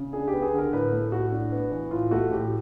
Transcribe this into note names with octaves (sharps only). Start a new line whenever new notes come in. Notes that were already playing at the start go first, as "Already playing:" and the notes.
Already playing: C#3
D4 G#4
G4
B3
G#4
D3 A#4
A2 B4
A3
A2 F#4
D4
B3
E3
A2 F4
A3 F#4
A2 G4